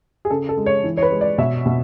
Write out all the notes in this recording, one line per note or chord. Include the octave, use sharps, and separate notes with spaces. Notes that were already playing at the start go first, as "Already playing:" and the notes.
G#4
C#3 A4
A4
G#3
C#5
E3
C#5
B4
G#3
D5
B2 E5
B2